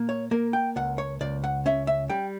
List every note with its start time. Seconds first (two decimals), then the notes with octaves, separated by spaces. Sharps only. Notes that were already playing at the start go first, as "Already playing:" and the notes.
Already playing: A#2 A#3
0.09 C#5
0.31 A#3 A#4
0.53 G5
0.76 C#2 F#5
0.98 C#5
1.21 C#2 D5
1.44 F#5
1.66 C#4 E5
1.87 E5
2.10 G3 G5